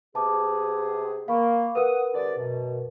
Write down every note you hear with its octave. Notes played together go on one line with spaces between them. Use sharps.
C3 B3 G#4 A5 D6
A#3 F5 B5 C#6
A#4 B4 F#5 D#6
C2 D3 D5
F#2 B2